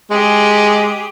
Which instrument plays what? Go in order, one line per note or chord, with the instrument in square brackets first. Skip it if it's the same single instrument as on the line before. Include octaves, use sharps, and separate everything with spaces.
[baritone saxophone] G#3 [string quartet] G4 G#4